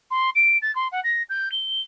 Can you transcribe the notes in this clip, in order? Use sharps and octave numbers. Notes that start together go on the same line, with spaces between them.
C6
D7
A6
C6
F#5
A#6
G6
G7